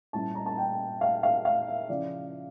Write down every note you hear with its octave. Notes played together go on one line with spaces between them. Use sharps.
A#2 G3 C#4 E4 A5
A#5
A5
G5
F5
F5
F5
E5
C#3 F3 C#4 E4 D5